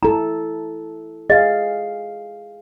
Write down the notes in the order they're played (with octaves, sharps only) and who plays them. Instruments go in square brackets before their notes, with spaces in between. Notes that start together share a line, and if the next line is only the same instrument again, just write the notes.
[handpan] E4 A4 [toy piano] A#5
[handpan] G#4 F5 [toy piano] D#5